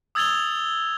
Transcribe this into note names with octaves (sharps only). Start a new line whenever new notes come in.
D#6 E6 G#6 A6 F7 G7